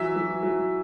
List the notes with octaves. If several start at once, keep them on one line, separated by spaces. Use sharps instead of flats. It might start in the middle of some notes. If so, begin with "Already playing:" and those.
Already playing: E3 F#3 E5
F#3
F#3